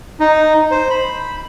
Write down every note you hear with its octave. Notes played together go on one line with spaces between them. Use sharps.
D#4
C5
B5